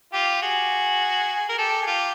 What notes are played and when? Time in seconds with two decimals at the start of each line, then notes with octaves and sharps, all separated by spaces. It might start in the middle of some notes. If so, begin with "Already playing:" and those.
0.13 F4 G4
0.42 F#4 G#4
1.49 A#4
1.58 G4 A4
1.83 G#4
1.86 F4 G4